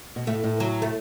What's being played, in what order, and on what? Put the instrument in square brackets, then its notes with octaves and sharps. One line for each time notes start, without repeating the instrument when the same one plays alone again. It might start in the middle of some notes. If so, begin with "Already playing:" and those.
[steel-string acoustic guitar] B2
[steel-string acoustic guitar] A2 [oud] A3
[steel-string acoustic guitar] A2
[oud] F#3
A3